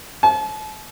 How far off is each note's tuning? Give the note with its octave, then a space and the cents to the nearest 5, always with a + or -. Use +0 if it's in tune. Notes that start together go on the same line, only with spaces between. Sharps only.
A5 -40